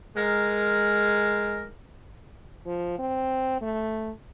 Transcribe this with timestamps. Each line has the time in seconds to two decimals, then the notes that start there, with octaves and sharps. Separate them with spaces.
0.15 G#3 A#4
2.66 F3
2.99 C4
3.62 A3